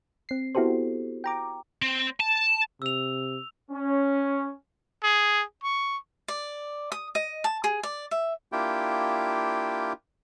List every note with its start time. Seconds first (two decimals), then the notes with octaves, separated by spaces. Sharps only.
0.29 C4 C7
0.55 B3 E4 F#4 G4 A4 C5
1.24 G5 A#5 D6
1.82 C4
2.20 A5
2.82 C3 E6 F7
3.71 C#4
5.03 G#4
5.63 C#6
6.28 D5
6.92 D#6
7.15 D#5
7.44 A5
7.64 G#4
7.83 D5
8.11 E5
8.52 A#3 D4 E4 F4 G4 G5